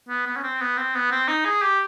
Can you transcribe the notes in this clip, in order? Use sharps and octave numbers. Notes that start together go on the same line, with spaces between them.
B3
B3
C#4
C4
B3
C4
B3
C4
D#4
G#4
G4